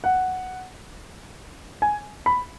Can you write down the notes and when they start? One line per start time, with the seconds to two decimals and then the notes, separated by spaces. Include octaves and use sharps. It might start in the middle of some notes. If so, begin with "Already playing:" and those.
0.04 F#5
1.82 G#5
2.26 B5